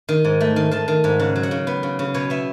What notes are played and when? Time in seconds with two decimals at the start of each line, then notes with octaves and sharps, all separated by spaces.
0.09 D#3
0.24 G#2
0.40 A3
0.56 D#3
0.71 D#3 A5
0.88 D#3
1.04 G#2
1.20 C#3 F#5
1.36 F#3
1.43 F#5
1.51 C#3
1.67 B3
1.83 C#3
1.99 C#3
2.14 B2 C#5
2.30 B3 E5